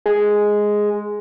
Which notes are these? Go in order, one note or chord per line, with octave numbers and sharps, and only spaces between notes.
G#3